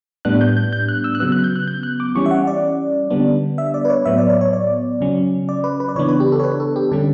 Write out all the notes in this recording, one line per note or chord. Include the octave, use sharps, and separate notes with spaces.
A2 G3 B3 D4 F#6
G6
G6
G6
F#6
E6
F#6
C#3 F#3 B3 E6
F#6
G6
F#6
G6
F#6
D6
E3 G3 C#4 C#6
E5
F#5
D5
D3 G3 B3 D4
E5
D5
B4
C#5
A2 F#3 B3 E5
D5
C#5
C#5
D5
C#3 F#3 C#4
D5
B4
B4
D5
C#3 E3 B3 D4 C#5
B4
G4
A4
C#5
B4
A4
G4
D3 G3 C#4 A4